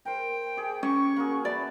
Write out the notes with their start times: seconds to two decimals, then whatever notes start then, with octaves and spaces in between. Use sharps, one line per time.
0.05 A#4 C5 G5
0.57 G4 G#4
0.83 C#4 C#5 A#5 C#6
1.16 A#3 F#4 G#4
1.45 E4 B4 D5 A5